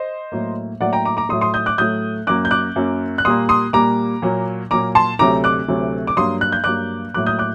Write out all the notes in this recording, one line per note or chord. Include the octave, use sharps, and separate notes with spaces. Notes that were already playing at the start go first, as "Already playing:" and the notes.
Already playing: C5 D#5
A2 F#3 A#3
A2 F#3 A#3 D5 F#5
G5 A#5
A#5 D6
A#5 D6
A2 F#3 A3 C6 D#6
C6 D#6
D#6 G6
D6 F#6
A2 F#3 A3 D#6 G6
F#2 F#3 A#3 D6 F#6
G6
D6 F#6
F#2 F#3 A#3
F#6
A#2 G3 A#3 C6 D#6
C6 D#6
A#2 G3 A#3 A#5 D6
A#2 F#3 A#3
A#2 F#3 A#3 A#5 D6
A5 C6
D2 C3 F#3 A3 A#5 D6
D6 F#6
D2 C3 F#3 A3
D6
G2 F#3 A#3 C6 D#6
F#6
G6
G2 F#3 A#3 D6 F#6
A2 F#3 A#3 D6 F#6
D#6 G6
D6 F#6